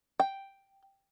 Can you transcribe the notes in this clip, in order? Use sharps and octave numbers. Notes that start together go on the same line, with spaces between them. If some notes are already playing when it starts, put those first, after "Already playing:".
G5